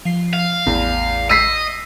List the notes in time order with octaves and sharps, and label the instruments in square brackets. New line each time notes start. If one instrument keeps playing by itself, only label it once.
[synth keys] F3 C7
[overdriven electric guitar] F5
[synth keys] A1 [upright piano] E2
[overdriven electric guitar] D#5 [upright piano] E6 B6 C7